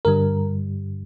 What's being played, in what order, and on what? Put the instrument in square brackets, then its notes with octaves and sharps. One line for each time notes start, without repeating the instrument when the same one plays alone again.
[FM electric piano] G2 D3 G3 A#4